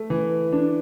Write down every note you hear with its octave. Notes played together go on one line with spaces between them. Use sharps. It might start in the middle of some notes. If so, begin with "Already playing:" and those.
Already playing: A3
E3
D4